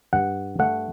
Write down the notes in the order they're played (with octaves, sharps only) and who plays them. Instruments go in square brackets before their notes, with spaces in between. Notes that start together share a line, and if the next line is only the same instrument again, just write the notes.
[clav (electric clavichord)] G2 F#5
A3 F#5